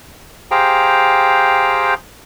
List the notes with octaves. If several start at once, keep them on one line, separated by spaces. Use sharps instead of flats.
G4 G#4 C5 F5 G5 A#5